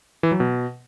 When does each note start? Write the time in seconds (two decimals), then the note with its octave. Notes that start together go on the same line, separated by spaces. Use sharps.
0.23 E3
0.32 F#3
0.40 B2